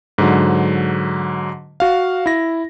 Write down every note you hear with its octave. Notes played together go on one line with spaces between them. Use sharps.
G#2 D3 F#3
F#4 F5
E4 A#6